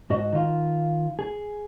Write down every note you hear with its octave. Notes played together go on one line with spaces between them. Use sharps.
G#2 F#4 D#5
D#3 F4
G#4